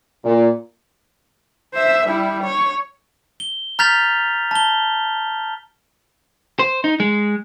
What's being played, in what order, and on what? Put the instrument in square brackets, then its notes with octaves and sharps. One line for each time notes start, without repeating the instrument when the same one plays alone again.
[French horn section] A#2
[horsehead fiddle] C5 E5
G3 E4
C#5
[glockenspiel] G7
A#5 F6 G6 A6 B6 F7
A5 G7
[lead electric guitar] C5
D#4
G#3